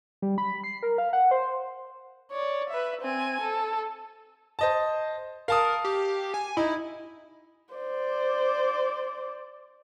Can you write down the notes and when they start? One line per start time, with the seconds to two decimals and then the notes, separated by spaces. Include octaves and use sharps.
0.22 G3
0.38 B5
0.64 C7
0.83 A#4
0.98 F5
1.13 F#5
1.31 C5
2.31 C#5 D5
2.69 B4 E5
3.01 C4 G#5
3.41 A4
4.59 C5 D#5 A5
5.48 A#4 F5 A5 D#6
5.84 G4
6.34 G#5
6.57 D#4 E4
7.74 C5 D5